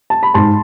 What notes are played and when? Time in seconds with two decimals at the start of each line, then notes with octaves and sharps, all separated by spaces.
0.10 A5
0.23 B5
0.34 G#2 A5 C6